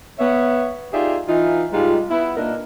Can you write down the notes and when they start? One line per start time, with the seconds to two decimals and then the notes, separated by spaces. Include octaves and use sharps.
0.19 B3 C#5 E5
0.93 D#4 F4 G4 G#4 D5 E5
1.28 E3 D#4 F4
1.73 G#2 G3 G#3 D#4 F4
2.11 B3 E4
2.37 A#2 A#3 D4 D#4 A#4